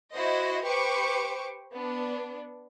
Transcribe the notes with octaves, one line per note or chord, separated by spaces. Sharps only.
E4 F#4 C5 D#5
G4 B4 C5 C#6 D6
B3 D4